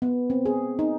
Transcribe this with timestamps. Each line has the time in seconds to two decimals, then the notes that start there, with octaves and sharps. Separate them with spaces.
0.02 B3
0.30 C4
0.46 G#4
0.79 D#4